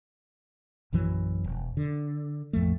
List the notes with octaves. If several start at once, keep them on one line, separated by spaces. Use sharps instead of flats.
A#1 F#2 E3 F#3
E1
D3
A1 F2 F3 A3